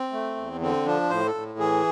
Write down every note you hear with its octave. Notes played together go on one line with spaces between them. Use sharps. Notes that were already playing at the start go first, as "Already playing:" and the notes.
Already playing: C4
A3
E2
D3 C4
F3 D4
A2 C5
A4
A2
E3 G#4